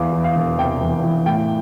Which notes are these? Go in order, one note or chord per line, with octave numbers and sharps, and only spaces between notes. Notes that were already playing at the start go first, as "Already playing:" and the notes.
Already playing: E2 F5
E3
F5
E1
C3 G5
E2
E3
A2 G5